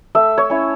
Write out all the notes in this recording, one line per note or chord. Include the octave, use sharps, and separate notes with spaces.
A3 E5
C#5
C#4 E4